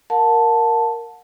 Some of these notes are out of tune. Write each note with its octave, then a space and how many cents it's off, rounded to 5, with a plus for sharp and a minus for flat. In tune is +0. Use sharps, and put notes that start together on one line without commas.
A#4 +0 F#5 -40 A5 +0